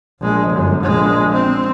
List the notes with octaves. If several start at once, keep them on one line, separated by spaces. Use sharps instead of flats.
A#1 G#3
G1 F#2
A#1 G#3
C4